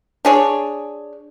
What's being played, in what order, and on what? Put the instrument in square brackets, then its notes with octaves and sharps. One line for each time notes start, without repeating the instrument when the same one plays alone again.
[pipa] D4 G#4 C#5